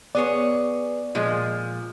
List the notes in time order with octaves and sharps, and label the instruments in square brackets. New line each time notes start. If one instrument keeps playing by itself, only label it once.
[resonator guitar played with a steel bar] B3 G#4 C#5 [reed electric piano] D5
[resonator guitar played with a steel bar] A#2 F3 G#3